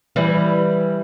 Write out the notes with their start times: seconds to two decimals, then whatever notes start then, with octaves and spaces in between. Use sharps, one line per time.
0.16 E3 G3